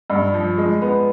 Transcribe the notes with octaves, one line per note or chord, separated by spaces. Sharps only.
G2
F3
G#3
B3